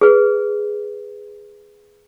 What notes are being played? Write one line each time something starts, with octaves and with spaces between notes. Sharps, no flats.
G#4 B4